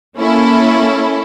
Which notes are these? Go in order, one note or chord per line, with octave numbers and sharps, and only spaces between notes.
A#3 C#4 E4 A4